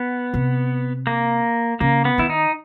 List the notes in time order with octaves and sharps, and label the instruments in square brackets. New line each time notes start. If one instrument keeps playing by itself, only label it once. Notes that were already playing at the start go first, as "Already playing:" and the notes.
Already playing: [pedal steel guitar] B3
[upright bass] C3
[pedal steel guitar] A#3
[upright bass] C#3 [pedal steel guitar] A#3
[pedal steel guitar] B3
[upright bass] D#3 [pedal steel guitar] E4
[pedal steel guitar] D#4